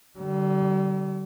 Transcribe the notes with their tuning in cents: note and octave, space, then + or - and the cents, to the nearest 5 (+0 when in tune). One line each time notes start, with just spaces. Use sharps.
D3 +0 G3 -45